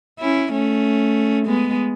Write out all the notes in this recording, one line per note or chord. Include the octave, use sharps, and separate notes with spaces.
C#4 E4
A3 C#4
G#3 B3